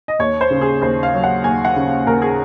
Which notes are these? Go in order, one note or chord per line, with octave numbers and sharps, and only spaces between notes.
D#5
D#2 C#5
C5
C#3
G#4
D#2 C5
F5
F#3
F#5
D#2 G#5
F#5
C#3
D#2 A#4
G#4